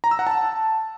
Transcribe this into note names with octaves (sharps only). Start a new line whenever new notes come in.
A#5
E6
F#5
A5